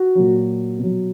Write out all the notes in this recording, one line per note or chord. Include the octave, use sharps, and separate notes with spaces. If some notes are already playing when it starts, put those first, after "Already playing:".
Already playing: F#4
A#2 F#3
B2 F#3